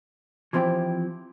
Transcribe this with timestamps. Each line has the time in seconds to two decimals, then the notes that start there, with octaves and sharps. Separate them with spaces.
0.53 E3 F3 C4 E4 G4